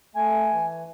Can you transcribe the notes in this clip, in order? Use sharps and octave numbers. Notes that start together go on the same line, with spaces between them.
A3 G#5
E3